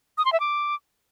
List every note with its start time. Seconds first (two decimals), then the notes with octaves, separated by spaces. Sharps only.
0.18 D#6
0.25 C6
0.33 E5
0.40 D6